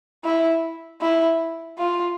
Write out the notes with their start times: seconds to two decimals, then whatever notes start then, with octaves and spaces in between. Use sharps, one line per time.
0.24 E4
1.01 E4
1.79 F4